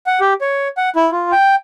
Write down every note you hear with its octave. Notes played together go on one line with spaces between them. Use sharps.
F#5
G4
C#5
F#5
E4
F4
G5